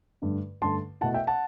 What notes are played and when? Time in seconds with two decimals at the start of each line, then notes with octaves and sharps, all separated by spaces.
0.22 G2 D3 A3
0.62 G2 D3 A3 A5 C6
1.01 B2 A3 E4 F#5 A5
1.14 E5 G5
1.27 F#5 A5